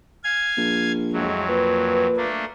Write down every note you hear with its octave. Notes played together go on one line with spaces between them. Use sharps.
F5 G#5 G#6
A#1
F2 A2 F#3 G#3
A#2 B4
A3 A#3 D4